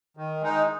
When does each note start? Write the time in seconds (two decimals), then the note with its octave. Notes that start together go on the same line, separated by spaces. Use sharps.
0.17 D#3
0.41 G#3 D#4